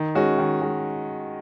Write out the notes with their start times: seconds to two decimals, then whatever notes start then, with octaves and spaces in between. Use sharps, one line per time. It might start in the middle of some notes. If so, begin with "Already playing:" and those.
Already playing: D#3
0.15 G#3 C#4 F#4
0.39 D#3
0.61 G#3 F#4